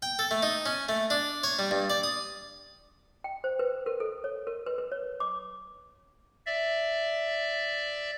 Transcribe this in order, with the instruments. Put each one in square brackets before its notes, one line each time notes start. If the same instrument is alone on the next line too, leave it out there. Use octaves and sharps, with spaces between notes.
[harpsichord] G5
A4
A3
D#4
C#4
A3
D4
C#5
G3
G2
D5
D#6
[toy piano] G5
C5
B4
A#4
A4
C#5
A#4
B4
B4
C#5
D6
[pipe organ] D5 E5